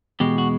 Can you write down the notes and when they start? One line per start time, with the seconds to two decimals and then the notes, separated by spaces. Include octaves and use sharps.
0.20 E2 B2 G#3 G4
0.38 F#4